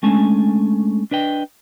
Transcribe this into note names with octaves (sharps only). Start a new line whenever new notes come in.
G#3 A3 C#4 D4 G#5 A5
D4 B4 D#5 G5